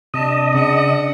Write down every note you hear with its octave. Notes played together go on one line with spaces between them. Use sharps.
C3 D4 D#5 A5
C#3 D4 F#5